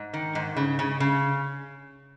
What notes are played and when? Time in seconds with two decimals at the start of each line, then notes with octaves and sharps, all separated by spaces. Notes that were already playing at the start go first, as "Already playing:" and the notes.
Already playing: G#2
0.14 D#3
0.35 G#2
0.57 C#3
0.79 C#3
1.00 C#3